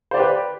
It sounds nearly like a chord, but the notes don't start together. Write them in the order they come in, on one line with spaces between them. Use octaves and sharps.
C5 D5 G4 B4